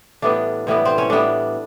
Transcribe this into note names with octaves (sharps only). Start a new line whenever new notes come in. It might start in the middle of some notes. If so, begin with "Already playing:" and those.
A2 E3 G3 B3 D4
A2 E3 G3 B3
C4
C#4
A2 E3 G3 B3 D4